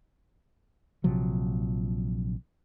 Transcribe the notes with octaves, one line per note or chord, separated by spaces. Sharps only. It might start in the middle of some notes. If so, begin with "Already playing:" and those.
A#1 C3 F3 F#3